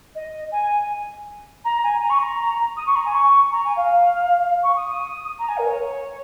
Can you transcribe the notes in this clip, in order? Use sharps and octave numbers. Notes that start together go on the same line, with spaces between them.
D#5
G#5
A#5
G#5
A#5
C#6
A#5
D#6
C#6
A#5
G#5
C#6
A#5
G#5
F5
C#6
D#6
D#6
A#5
G#5
A#4
C#5